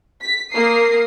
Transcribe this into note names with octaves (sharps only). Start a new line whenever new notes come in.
B6
A#3 A#4 D#6 C7